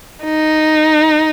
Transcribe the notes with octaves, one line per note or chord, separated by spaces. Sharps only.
D#4